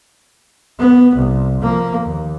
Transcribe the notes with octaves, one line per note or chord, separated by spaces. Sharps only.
B3
C2
F3 A#3
D#2